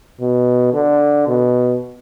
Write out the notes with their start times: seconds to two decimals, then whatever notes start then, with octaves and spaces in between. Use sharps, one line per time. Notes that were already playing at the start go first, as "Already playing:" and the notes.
0.20 B2
0.74 D3
1.27 B2